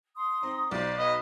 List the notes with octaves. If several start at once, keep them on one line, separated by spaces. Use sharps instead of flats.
C6 D#6
C4 D#4
B1 C5 D5
B3 C#5 D#5